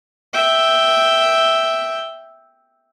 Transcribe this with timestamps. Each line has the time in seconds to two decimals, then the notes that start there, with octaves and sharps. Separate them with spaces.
0.34 E5 G5